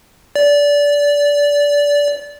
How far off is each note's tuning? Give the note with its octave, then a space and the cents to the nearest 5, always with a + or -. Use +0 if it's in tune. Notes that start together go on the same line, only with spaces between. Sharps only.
D5 -20